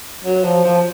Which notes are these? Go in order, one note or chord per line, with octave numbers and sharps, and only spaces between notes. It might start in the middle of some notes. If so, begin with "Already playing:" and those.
F#3
F3
F3